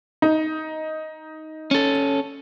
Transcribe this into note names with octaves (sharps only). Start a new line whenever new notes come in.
D#4
C#4 A4